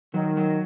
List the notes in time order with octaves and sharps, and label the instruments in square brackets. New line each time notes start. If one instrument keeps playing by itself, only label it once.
[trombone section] D#3 [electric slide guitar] F#3
[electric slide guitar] F#3